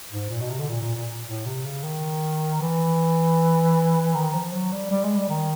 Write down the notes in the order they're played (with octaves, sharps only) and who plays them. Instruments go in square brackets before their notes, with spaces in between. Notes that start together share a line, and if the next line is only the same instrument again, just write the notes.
[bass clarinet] G#2
A#2
B2
C3
D3
A#2
A#2
A#2
A2
C3
C#3
D#3
E3
D#3
F3
F#3
G3
G3
G#3
G3
D#3